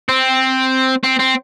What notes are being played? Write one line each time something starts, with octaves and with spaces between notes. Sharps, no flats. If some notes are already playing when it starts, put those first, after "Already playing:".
C4
C4
C4